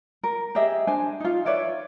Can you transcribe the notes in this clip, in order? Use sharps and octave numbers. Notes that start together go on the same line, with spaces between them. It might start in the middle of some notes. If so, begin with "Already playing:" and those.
A#4
G4 G#4 D#5 E5
D4 C5 G#5
D#4 F4
B4 C#5 D5 E5